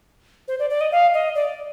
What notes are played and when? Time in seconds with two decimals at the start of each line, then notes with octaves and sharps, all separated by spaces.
0.48 C5
0.59 D5
0.70 D5
0.81 D#5
0.92 F5
1.14 D#5
1.35 D5